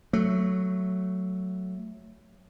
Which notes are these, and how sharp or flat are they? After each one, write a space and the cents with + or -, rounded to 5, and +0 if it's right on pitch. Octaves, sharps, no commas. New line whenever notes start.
F#3 +0 A3 +0